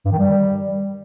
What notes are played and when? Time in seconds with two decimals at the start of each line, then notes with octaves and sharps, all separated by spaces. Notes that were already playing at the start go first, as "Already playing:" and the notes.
0.05 G2
0.12 D#3
0.19 G3